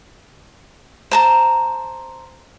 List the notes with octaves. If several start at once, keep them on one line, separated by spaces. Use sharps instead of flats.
C5 A5 A#5